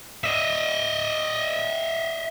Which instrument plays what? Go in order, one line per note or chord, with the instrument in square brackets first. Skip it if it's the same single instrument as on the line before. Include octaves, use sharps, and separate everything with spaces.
[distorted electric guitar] D#5 E5